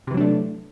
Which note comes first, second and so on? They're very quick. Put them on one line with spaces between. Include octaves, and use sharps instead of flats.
C3 E3 F#3 D4 A3